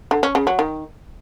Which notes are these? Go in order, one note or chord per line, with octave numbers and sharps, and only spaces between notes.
D3
C#4
C#3
F#3
D#3